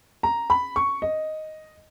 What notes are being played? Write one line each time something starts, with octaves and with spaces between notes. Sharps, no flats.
A#5
B5
C#6
D#5